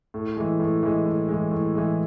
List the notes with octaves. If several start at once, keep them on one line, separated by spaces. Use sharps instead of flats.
A2
E3 G#3
A2
E3 G#3
A2
E3 G#3
A2
E3 G#3